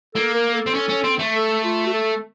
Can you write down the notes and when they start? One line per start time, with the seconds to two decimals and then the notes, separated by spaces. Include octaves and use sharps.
0.14 A#3 A4
0.34 A#4
0.54 A4
0.66 C4
0.74 C#4
0.89 C#4
1.04 C4
1.19 A3
1.34 A4
1.64 F4
1.87 F#4
1.93 A4